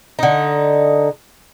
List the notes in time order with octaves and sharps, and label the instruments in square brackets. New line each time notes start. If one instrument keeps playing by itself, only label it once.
[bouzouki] D3 D#4